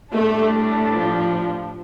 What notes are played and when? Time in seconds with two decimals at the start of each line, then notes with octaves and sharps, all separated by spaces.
0.14 A2 G3 A3 D4
0.55 A3
0.96 F3